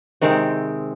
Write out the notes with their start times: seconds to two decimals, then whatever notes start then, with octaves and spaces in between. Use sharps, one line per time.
0.21 C3 D#3 G#3 C4